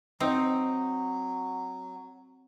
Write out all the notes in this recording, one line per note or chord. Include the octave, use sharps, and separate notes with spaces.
F#3 C4 D#4